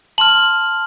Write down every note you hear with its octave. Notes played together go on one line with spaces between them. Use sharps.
A5 C6 F6 F#7